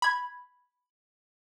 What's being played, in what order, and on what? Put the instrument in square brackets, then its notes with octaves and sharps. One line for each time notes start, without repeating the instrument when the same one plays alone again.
[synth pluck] B5 G#6